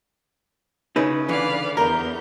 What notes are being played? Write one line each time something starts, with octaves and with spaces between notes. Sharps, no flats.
C#3 D#4 E4 B4
D3 E3 B4 D5 F5
E2 A#4 G6